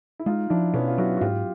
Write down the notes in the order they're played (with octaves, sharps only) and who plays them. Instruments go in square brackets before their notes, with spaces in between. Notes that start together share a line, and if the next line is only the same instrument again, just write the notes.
[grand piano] E4
[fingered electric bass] G#3 [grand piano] D#4 F4
[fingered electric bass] F3 [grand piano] D4 E4
[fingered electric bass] B2 [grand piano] B3 C#4
[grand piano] F4
[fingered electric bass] F#3 [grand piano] E4 F#4
[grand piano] F#4
[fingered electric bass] G#2 [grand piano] F4 G4